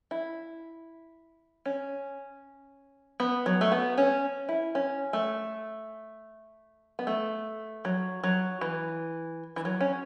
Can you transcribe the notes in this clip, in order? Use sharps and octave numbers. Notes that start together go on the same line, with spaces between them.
E4
C#4
B3
F#3
A3
B3
C#4
E4
C#4
A3
B3
A3
F#3
F#3
E3
E3
F#3
C#4